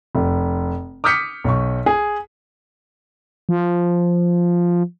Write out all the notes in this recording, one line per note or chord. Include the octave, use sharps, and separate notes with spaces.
F1
D6 D#6 F6 G6 B6 C#7
B1 C#6
G#4
F3